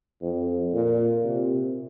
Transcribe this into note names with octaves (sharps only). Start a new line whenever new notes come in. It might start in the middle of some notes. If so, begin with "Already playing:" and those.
F2
A#2
C3